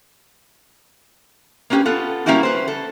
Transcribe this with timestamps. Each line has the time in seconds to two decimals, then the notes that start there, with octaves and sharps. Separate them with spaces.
1.70 A#3 B3 C#4 F4 G4 B4
1.85 B3 F4 A4
2.26 G3 A#3 C#4 E4 F#4 G4
2.43 B4 C5
2.68 A4